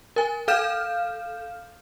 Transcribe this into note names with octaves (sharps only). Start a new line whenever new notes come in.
A#4 G#5
A4 F5 F6 G6 E7